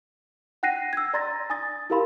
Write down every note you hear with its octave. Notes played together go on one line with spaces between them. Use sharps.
F#5 G5 F#6 A#6 C7 D#7
E6 G#6
D5 A#5 C6 A6 A#6
G#5 D#6 A6
E4 G4 A#4 F5 B5 C6